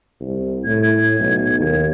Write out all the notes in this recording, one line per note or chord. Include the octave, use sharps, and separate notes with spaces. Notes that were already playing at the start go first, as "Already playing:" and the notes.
C2
A2 G#6
B1
D#2